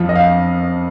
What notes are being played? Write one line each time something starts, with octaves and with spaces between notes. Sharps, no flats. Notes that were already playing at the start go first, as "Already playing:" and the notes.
Already playing: F2 F3
D#5
F5